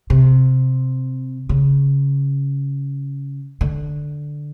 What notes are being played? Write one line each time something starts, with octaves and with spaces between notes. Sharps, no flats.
C3
C#3
D3